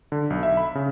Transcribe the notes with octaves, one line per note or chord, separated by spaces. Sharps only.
D3
B1
E5
B5
C#3